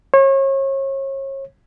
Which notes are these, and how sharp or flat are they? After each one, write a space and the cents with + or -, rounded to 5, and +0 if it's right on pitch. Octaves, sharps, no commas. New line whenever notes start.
C#5 -35